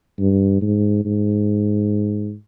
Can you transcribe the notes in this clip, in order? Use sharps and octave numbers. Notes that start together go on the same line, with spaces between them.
G2
G#2
G#2